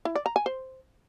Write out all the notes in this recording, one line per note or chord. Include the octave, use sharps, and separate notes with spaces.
E4
D5
A#5
G#5
C5